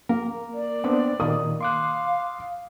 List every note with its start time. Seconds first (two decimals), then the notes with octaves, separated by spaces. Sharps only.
0.09 A#3 A#4
0.54 D5
0.84 B3 C4 D4
1.20 A#2 D#3 A#3 D#6
1.61 F5 C6 D6 F#6